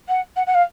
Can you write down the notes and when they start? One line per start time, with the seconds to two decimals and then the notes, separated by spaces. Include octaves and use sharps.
0.08 F#5
0.36 F#5
0.46 F#5
0.54 F5